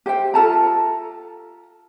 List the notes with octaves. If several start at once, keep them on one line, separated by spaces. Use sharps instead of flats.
G4 C5 E5 G5
F4 A4 A5 A#5